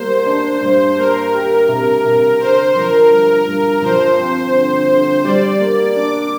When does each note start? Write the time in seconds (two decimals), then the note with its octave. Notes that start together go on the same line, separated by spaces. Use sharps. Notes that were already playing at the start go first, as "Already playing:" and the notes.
Already playing: G3 A#3 C5
0.26 D4
0.61 G2
0.98 A#3 A#4
1.34 G4
1.69 C3
2.05 C3
2.40 D3 C5
2.75 F3 A#4
3.11 G2 A#4
3.46 G2
3.82 F3 C5
4.18 C4
4.53 D3
4.89 D3
5.24 G3 D5
5.60 A#3
5.96 D4 D6